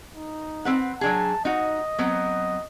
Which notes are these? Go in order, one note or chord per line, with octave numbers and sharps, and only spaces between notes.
D#4
C4 B4 F#5
F#3 D4 G#4 A5
D#4 F#4 D#5
F#3 B3 C4